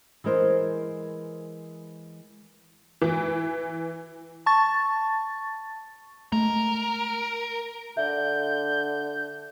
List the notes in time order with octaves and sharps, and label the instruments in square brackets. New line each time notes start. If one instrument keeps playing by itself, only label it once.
[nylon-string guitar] E3 G#3 A#4 C5
[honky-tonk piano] E3
[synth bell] A5 C#6 A6
[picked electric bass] G#3 A3 [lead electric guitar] A#4
[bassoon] D3 [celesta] E5 [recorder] G6